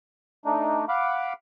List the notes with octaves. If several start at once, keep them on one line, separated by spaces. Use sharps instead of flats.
A3 D4 D#4
F5 F#5 B5 D6